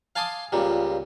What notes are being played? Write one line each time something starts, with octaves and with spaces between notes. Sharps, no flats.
F5 G#5 A5 C6 D6 D#6
C#2 A#2 G3